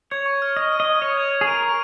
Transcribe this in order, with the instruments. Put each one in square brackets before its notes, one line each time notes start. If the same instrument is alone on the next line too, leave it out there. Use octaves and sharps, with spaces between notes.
[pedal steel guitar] C#5 [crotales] G#6
[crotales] C#6
F6
[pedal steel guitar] D#5 [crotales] F6
[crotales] D#7
[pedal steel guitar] D#5
[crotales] C#6
[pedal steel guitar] C#5 [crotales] C#6
[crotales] G#6
G#6
[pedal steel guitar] G#4
[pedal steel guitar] A#4 [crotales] D#7
[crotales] C#6